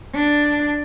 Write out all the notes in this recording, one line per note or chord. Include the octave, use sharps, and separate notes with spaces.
D4